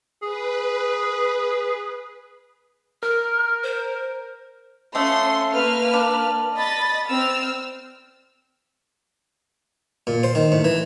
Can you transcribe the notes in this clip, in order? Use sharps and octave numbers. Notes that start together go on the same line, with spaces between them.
G#4 B4
A#4 F6
C5
F3 A3 C#4 C6
A#3 B4 F6
D4
D#5 B5 A6
C4 E6 F6
A#2
C5
D#3
A2
E3